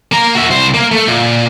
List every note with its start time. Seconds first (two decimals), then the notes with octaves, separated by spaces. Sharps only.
0.12 A#3 A#5
0.35 F#4 E5
0.50 C2 C5
0.74 A#3
0.92 A3
1.08 A#2